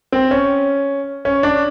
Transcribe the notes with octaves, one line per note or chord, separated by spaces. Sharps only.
C4
C#4
C#4
D4